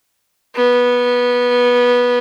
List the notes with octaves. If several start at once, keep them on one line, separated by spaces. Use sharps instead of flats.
B3